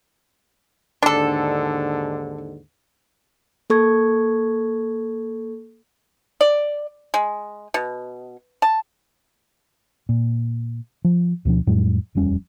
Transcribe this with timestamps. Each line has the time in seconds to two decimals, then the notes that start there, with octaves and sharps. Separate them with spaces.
1.03 D#2 G#2 D3 D4 A4
3.70 A#3 A4 C#6 G#6
6.41 D5
7.14 G#3
7.74 B2
8.62 A5
10.09 A#2
11.04 F3
11.45 D2 B2 F3 D4
11.67 F2 A2 F#3 G#3
12.15 D#1 F2 G3 C#4